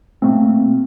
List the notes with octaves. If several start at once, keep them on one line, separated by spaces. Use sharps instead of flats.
B2 A3 A#3 C4